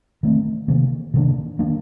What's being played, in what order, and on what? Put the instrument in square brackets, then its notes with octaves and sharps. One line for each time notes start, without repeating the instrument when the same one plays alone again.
[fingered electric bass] D#3 A3 C4
C3 D#3 A#3
C3 D#3 A#3 D4
D#3 A#3 D4